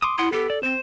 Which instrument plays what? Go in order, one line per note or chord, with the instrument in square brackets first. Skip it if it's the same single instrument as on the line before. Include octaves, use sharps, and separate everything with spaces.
[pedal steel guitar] C6 D6 D#6
[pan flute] E4 [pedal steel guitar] F#5 C6 D#6
[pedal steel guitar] B3 G4 [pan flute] A4
[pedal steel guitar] D5
[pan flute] C4 [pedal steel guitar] C5